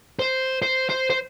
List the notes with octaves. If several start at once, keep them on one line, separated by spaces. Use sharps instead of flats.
C5
C5
C5
C5